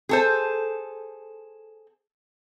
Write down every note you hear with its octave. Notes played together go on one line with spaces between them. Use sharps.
G#4 A4 C5